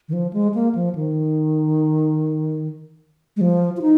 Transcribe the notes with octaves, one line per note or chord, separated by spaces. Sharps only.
D#3
F3
G#3
A#3
F3
D#3
G#3
F3
F4
D#4